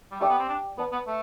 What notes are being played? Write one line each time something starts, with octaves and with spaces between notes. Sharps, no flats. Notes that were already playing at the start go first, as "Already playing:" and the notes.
G3
A3 G4 D5 G5 D6
B3
C4
D4
B3 B4 D5 A5
B3
A3